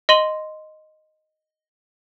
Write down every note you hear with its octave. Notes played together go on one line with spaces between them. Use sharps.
D#5 C6 A#6 D#7 F#7